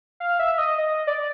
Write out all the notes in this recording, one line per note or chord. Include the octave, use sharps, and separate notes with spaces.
F5
E5
D#5
D#5
D5